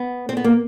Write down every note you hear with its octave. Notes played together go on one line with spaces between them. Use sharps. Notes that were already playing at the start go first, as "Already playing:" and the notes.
Already playing: B3
C4
B3
A#3